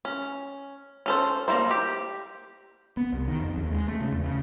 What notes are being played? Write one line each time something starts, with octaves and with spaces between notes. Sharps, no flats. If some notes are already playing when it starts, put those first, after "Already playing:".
C#4
C#4 A4 C5
G3 A#3 C4 E4 C5
G4
B3
C2
D#3
F2
D#2
G#3
A3
C#3
E2
C#3